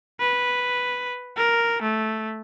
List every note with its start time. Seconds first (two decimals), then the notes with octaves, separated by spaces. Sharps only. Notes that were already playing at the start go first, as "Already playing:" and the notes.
0.20 B4
1.37 A#4
1.82 A3